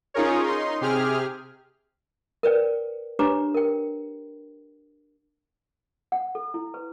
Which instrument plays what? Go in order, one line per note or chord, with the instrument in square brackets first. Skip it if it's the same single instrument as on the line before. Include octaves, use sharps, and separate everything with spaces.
[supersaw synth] C#4 D#4 F4 G#4 A#4 C#5
D#4 C6
C3 G4 G#4 F6
[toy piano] A#4 B4 D5 G5
D4 G4 B4 C#5 A#5 D6
A#4 G5
F#5
A4
E4
B4